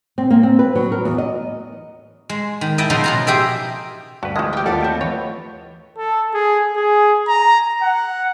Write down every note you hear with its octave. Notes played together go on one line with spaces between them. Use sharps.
C4
A#3
C4
B4
F#3
A#4
E2
D#5
G#3
D#3
E4 D#5 E5 G5 A5
C#3 F3 B3 D#4 D#5 C6
B2 F4 A#5
G4 G#4 E5 G5
D2 G2 F#4 B4
E3 F3 G#3 F#4 D#5
F4 G4 G5
D#2 G3 A3 F4 A4 D5 F#5
B3 C4
E3 C#5
A4
G#4
G#4
A#5
F#5